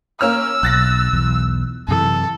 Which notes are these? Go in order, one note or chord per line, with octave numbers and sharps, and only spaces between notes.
A#3 C#4 E6 F6
B1 F#6 A6 A#6
B1 E2
F#2 C3 E3 A4